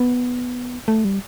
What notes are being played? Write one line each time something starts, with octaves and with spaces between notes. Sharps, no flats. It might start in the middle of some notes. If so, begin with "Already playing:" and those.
Already playing: B3
A3
G3